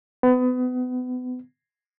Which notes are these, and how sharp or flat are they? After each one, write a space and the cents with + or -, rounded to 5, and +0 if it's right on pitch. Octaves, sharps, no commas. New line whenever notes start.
B3 +30